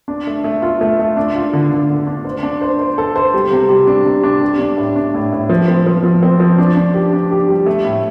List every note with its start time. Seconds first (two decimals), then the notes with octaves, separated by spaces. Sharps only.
0.08 D4
0.27 A3
0.44 A3
0.62 F4
0.81 A3
0.99 A3
1.17 D4
1.35 F4
1.53 D3
1.71 D3
1.90 D3
2.07 D4
2.25 C5
2.43 D4
2.61 C5
2.79 C5
2.98 A4
3.16 C5
3.34 G3
3.51 C3
3.69 G3
3.87 D4
4.05 C3
4.24 D4
4.41 G3
4.59 D4
4.77 A2
4.96 D4
5.14 A2
5.32 A2
5.49 F3
5.68 C4
5.86 F3
6.04 F3
6.23 C4
6.40 F3
6.58 D4
6.77 D4
6.94 G4
7.13 D4
7.31 G4
7.49 G3
7.66 A3
7.84 A2